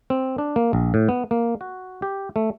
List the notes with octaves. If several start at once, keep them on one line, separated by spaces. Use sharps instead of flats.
C4
D4
A#3
A#1
A2
B3
A#3
F#4
G4
A3